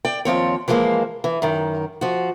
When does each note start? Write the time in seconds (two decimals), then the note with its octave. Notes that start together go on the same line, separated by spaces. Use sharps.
0.05 D5 G5
0.25 D#2 F3 C4 C#5
0.68 E3 F3 G#3 A#3 C5
1.24 E3
1.42 F#2 D#3
2.01 F3 F#4